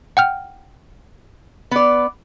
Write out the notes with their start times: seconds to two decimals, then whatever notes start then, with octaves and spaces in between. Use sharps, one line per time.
0.17 F#5 G5 F6
1.71 B3 D5